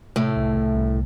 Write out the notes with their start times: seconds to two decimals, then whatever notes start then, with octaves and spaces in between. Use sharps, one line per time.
0.16 A2 C3 A3
0.36 C2
0.55 C2
0.76 C2